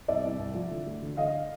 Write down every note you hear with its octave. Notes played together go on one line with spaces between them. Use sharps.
C2 D5 E5
C2
C2
F3
D3
D2
D3
D3 D#5 F5